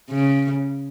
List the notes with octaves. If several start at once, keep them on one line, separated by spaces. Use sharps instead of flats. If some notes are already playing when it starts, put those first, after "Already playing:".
C#3